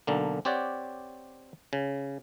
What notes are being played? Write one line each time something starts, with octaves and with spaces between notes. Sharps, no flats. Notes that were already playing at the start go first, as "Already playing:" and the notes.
B1 D3 A#3
C4 G4 C#5 D5 F#5
C#3